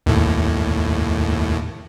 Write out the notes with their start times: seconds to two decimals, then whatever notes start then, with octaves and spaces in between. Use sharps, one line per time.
0.06 D#2 A2